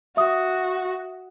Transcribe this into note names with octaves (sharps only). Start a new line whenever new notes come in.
F#4 E5 D#6